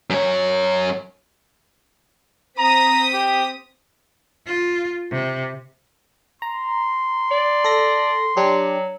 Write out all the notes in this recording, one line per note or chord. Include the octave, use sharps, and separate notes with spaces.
F#2 C#5
C4 A#5 D#6 B6
G4
F4
C3
A#5 C6
D5
A4 A#6
F#3 D4 G4